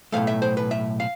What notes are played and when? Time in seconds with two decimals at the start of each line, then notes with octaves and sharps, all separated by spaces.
0.12 B1 A2 E3 A3 F5
0.27 E5
0.42 C5
0.57 B4
0.71 E5
1.00 F5